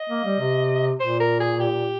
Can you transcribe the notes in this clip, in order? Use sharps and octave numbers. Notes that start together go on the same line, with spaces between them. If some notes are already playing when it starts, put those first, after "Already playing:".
Already playing: D#5
A#3
G3
C3
A#2 C5
A#4
G#4
G4